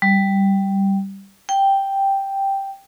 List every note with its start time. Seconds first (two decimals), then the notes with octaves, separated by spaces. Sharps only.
0.02 G3
1.49 G5